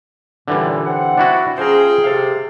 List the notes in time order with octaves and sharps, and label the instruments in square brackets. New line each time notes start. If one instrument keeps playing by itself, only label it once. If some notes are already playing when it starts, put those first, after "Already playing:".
[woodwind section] F#2 A#2 [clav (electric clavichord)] D3 E3 G3
[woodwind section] C4 F#5
[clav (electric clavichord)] D4 E4 F#4
[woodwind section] F3 C#4 [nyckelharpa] G#4 G5 [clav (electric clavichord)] C5 A#5
[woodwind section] C3 [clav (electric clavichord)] A4 F5